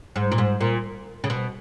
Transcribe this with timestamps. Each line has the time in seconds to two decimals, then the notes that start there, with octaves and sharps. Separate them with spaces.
0.16 G#2
0.32 A#2
0.38 G#2
0.61 A#2
1.24 C#3
1.30 B2